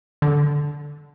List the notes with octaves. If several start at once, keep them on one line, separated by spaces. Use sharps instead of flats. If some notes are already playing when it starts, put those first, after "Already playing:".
D3